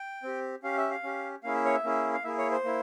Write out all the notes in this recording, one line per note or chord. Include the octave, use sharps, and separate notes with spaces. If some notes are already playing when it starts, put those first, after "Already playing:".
Already playing: G5
C4 G4
C#4 G4 F5
E5
F5
C#4 G4
A#3 C#4 E4 G#4 F5
E5
C#5
E5
A#3 C#4 E4 G#4
F5
A#3 E4 G#4 E5
C#5
C5
A#3 E4